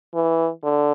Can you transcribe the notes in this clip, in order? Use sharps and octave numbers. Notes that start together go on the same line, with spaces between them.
E3
D3